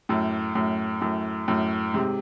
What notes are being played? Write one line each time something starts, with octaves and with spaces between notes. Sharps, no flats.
F#2 A2
F#2 A2
F#2 A2
F#2 A2
G#2 C3